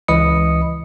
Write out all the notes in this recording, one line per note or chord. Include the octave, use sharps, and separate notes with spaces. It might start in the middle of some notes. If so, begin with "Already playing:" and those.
C#2 E3 D#5 B5 D#6 C#7